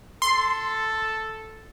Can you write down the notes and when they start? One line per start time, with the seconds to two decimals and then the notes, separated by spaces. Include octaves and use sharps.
0.22 A4 C6